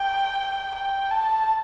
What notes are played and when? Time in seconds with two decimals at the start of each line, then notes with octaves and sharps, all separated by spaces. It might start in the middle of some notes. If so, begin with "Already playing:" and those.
Already playing: G5
0.75 G5
1.11 A5